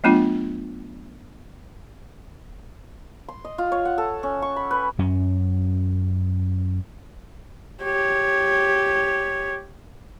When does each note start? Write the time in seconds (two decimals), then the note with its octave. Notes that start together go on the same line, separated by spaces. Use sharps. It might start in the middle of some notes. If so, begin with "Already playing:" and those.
0.04 F#3 A3 B3 D4 F4
3.28 C6
3.45 D#5
3.58 F4
3.72 C#5
3.85 F#5
3.98 A4
4.23 C#4
4.42 C#6
4.56 B5
4.71 B4
4.99 F#2 C#4
7.83 G4 C#5